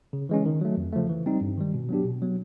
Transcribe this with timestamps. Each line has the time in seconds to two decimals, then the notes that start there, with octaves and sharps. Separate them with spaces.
0.13 C#3
0.29 E3 G#3 C#4
0.46 D#3
0.61 F#3 A3
0.77 F2
0.93 C#3 F3 A3
1.09 E3
1.26 G3 C4 D#4
1.41 G2
1.58 D#3 G3
1.74 B2
1.89 F#3 B3 D4 G4
2.05 B2
2.22 F#3 B3